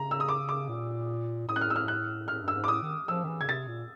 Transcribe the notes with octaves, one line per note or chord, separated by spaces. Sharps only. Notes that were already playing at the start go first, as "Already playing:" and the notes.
Already playing: C#3 A#5
E6
D#6
D6
D6
A#2
A2 D#6
F#6
F6
E6
F6
F#6
A2 F6
G2
E6
G#2
D6
A2 D#6
D#3
F3 E6
D#3
E3
C#3 G#6
C3 A6
A#2